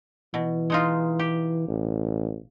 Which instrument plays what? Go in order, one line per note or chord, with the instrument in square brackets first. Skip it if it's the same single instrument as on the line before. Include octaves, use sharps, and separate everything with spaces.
[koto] B2 [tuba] E3
[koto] G#3 D#4 F4
G4
[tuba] A1